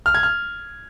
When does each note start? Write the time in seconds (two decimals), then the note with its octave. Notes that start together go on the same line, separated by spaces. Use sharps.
0.06 F6
0.14 G#6
0.23 F6